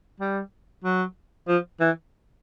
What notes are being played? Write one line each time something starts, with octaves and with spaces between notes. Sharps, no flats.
G3
F#3
F3
E3